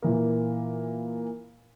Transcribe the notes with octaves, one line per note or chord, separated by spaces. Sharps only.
A#2 E3 A#3